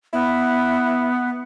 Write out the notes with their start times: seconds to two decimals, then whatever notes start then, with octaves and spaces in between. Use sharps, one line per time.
0.13 B3 E4